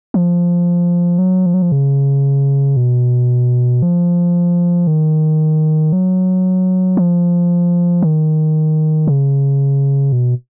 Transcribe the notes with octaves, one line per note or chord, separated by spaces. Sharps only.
F3
F#3
F3
F#3
F3
C#3
B2
F3
D#3
F#3
F3
D#3
C#3
B2